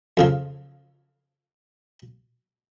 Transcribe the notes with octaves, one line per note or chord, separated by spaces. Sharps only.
F2 C#3 F3